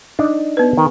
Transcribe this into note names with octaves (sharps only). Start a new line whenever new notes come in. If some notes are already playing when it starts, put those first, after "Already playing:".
D4 D#4
B3 B4
D#3